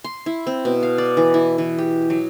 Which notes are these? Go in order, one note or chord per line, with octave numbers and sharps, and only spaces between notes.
C6
E4
C4
B2
F5
D5
E3
E4
E3
G4
F#3